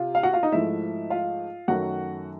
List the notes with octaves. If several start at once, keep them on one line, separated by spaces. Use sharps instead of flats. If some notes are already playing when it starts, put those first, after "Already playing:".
Already playing: C3 F4
F5
F#4 F#5
F4 F5
D#4 D#5
G#2 F3 A3 E4 E5
F4 F5
F#2 D#3 F#3 A3 F#4 F#5